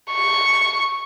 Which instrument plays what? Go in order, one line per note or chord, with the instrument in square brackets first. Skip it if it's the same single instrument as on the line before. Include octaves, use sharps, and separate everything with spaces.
[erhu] C#6